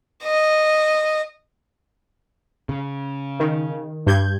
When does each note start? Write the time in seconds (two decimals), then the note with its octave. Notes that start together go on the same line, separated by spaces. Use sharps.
0.24 D#5
2.69 C#3
3.40 D#3
4.06 G2 G6 G#6